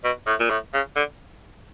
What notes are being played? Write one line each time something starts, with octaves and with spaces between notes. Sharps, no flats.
B2
A2
A#2
A2
C#3
D3